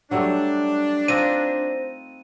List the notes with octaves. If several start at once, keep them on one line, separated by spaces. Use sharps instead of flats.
F#3 G3 A3 D4
C4 D#4 F4 C5 A#6 D#7